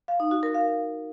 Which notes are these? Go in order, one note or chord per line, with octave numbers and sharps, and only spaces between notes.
F5
D#4
F#4
A#4
F5